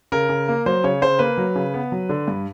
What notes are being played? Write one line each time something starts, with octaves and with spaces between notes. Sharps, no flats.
C#3 A#4
C#3
A#3
F#3 C5
C#3 C#5
C#3 C5
A#3 B4
F#3
C#3
B3
F#3
D3
G2